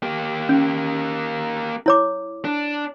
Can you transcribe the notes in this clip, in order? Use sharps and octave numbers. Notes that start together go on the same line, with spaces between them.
A#3 G4
C#4
E4 C#5 D6
D4